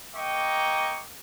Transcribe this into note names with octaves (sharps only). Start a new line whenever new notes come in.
A#3 D#5 G5 A#5 C#6 D6